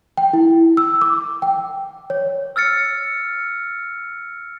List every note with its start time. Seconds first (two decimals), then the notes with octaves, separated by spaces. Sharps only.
0.17 G5
0.33 E4
0.77 E6
1.01 D6
1.42 G5
2.10 C#5
2.56 E6 F6 A6 C#7